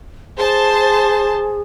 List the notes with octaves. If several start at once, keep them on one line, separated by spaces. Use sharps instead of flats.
G#4 C5 A5